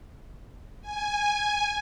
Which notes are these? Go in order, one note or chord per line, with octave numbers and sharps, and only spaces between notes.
G#5